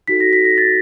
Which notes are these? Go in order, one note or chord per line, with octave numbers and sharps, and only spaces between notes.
D#4 F#4 A4 B6
A#6
B6
A#6
A6